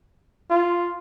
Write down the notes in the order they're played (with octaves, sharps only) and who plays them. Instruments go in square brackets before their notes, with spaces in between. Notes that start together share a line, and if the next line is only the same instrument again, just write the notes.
[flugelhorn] F4